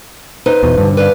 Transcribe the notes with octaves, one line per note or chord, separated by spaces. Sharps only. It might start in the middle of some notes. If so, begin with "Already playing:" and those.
D#4 B4 C5
D#1 E2 B2
G2 D3
B4 D5 F5